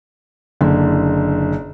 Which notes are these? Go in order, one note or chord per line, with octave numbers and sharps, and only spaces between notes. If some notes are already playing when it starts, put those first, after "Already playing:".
F#1 D3